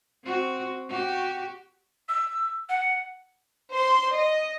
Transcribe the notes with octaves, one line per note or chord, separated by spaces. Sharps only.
C4 F#4
F#4 G4
E6
F#5
C5 C6
D#5